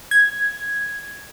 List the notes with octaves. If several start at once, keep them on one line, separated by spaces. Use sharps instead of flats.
G#6